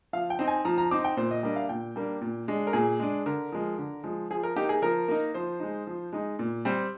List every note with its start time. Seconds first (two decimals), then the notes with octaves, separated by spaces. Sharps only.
0.13 F3 F5
0.30 G5
0.39 C4 D#4
0.48 G#5
0.65 F3 A#5
0.78 A#5
0.91 C4 D#4 D6
1.04 G5
1.17 A#2 C5
1.31 D#5
1.43 G3 A#3 D4 D#5
1.56 F5
1.69 A#2 G5
1.96 G3 A#3 D4
2.21 A#2
2.48 G#3 D4
2.67 A#4
2.73 A#2 G#4
3.00 G#3 D4
3.26 D3 A#4
3.52 F3 G#3
3.78 D3
4.04 F3 G#3
4.30 F3 G#4
4.43 A#4
4.56 A#3 D#4 G4
4.69 G#4
4.82 F3 A#4
5.08 A#3 D#4
5.34 F3 C5
5.60 G#3 D#4
5.87 F3
6.13 G#3 D#4
6.39 A#2
6.65 G3 C4